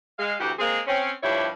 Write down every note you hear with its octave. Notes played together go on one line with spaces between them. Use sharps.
G#3 F5
D2 E3 F#4 G4
G#3 A#3 C4 G#4
C4 C#4
G2 F3 D4 E4 G4 C#5